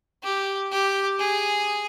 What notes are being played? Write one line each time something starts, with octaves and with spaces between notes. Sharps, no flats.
G4
G4
G#4